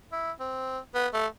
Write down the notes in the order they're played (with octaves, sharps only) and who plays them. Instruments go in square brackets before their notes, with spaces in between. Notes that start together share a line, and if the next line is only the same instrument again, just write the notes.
[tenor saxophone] E4
C4
B3
A3